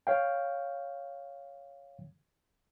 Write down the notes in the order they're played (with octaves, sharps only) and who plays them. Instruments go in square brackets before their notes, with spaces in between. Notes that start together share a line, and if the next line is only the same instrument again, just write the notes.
[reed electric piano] C#5 F5 G5